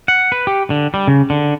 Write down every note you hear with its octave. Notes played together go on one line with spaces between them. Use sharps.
F#5
B4
G4
D3
G3
C#3
D3